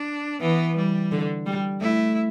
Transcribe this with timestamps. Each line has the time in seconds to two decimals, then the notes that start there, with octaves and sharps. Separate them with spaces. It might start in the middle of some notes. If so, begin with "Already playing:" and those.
Already playing: D4
0.41 E3 B3
0.76 G3
1.11 D3
1.46 G3
1.81 A3 E4